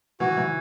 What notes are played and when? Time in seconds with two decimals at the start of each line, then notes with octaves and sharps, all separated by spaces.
0.20 E3 F#4
0.37 E3